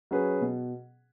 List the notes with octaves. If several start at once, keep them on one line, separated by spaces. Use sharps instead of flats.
F#3 C#4 G#4 B4
B2